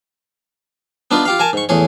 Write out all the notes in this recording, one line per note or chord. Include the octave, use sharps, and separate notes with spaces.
B3 D4 D#4 F4 B4
F4 G4 F5
A#4 G#5 A5
G#2 C#6
E2 A2 G#4 C#5